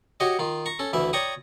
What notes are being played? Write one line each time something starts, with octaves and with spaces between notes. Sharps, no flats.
F#4 G4 C#5 D#5
D#3 F4
A#5 C#6
C#4 A4
D2 E3 E5
C#5 D5 G5 A#5 C#6 D#6